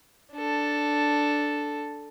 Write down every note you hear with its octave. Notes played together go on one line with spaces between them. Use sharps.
D4 A4